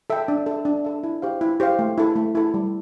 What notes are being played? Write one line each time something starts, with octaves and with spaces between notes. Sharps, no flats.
A4 E5 G5
D4
A4 E5
D4
A4 E5
E4
G4 C5 F5
E4
G4 C5 F5
A3
E4 A4
A3
E4 A4
G3